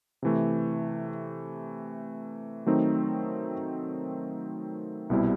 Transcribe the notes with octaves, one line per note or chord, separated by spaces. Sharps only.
C3 E3 A3
D#3 F#3 A3 C4 D#4
C2 B2 G3 C4 E4